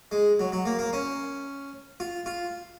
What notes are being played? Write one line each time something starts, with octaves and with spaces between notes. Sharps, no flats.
G#3
F#3
F#3
A#3
A#3
C#4
F4
F4